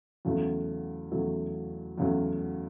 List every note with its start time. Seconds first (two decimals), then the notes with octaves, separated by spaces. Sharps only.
0.25 E2 C#3 F#3 A3
1.11 E2 C#3 F#3 A3
1.98 E2 C#3 F#3 A3